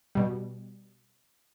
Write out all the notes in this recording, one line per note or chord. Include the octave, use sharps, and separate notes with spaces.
B2 G3